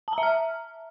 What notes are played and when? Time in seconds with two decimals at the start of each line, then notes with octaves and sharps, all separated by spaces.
0.08 A5
0.13 A#5
0.18 E5
0.23 F6